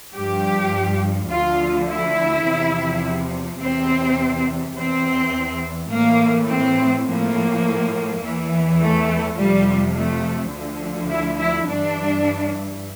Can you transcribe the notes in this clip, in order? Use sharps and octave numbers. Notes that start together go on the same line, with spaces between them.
G2 F3 G4
D2 D3 F3 F4
E4
E2 C3 F3
E2 C3 E3 C4
E2 E3 C4
A2 E3 A#3
C4
A2 F3 A#3
E2 E3
A3
F2 C3 F3 G3
A3
D2 D3 F3
E4
E4
G2 E3 D4